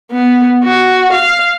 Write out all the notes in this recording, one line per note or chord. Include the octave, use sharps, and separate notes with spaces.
B3
F#4
F5